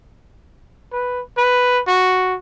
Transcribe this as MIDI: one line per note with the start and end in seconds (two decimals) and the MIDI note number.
0.93 1.22 71
1.38 1.81 71
1.87 2.36 66